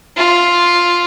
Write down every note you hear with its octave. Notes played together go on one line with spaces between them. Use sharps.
F4